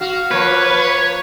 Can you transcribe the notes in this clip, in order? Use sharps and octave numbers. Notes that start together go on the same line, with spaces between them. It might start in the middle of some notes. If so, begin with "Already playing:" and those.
F#4 F5
F3 A#3 B4 C#5